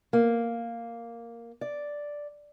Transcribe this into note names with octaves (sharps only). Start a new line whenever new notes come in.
A#3
D5